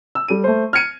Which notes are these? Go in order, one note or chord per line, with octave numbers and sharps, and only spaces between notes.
E6
G3 A4 D#7
A3 C5
F6 G#6 C#7 D#7